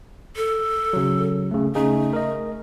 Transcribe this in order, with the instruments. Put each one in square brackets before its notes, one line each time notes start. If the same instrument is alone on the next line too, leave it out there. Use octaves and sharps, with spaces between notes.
[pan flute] A4
[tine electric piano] C#3 F#3
C#3 A3
[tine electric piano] C#3 D#4 G#4 [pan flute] A3
[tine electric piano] A#4 D#5